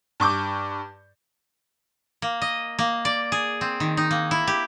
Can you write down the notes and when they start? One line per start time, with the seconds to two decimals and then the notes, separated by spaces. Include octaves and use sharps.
0.20 G2 C#6 D6 G6
2.22 A#3
2.42 D#5
2.79 A#3
3.05 D5
3.32 G#4
3.61 C4
3.80 D#3
3.97 D#4
4.11 A#3
4.31 E4
4.47 G4